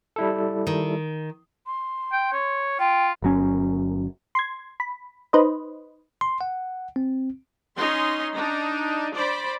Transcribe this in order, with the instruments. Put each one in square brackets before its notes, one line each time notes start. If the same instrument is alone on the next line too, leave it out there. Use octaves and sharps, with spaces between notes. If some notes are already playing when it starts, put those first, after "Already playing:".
[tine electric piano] G3 E4 A4
[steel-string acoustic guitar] D#3
[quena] C6
[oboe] G5
C#5
[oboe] F4 [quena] G5
[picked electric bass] G1 F#3 C#4
[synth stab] C6 G#6
B5
D#4 B4 C5 D#5
[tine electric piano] C6
F#5
C4
[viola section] C#4 D#4 C6
D4 D#4
C5 D5 B5